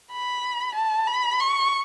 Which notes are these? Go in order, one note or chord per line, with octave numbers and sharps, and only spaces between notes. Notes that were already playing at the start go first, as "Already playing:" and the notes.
B5
A5
B5
C#6